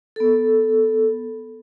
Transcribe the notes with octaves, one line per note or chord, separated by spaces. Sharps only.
B3 A4